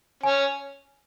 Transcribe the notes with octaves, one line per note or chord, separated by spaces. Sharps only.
C#4 G#5